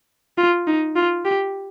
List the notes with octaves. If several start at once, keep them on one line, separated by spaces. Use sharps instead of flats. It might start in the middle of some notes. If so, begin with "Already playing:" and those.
F4
D#4
F4
G4